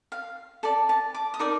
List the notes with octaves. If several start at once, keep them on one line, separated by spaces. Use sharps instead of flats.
F5
A4 D5 A5
A5
D6
D#6
D#4 A#4 D5 D6